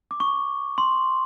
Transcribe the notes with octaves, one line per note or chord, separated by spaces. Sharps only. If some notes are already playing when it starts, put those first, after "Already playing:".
D6
C#6
C6